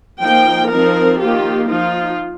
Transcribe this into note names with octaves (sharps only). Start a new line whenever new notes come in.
F3 A#3 D#4 G5
F3 C4 D#4 A#4
D#3 A#3 F4 G4
F3 D#4 F4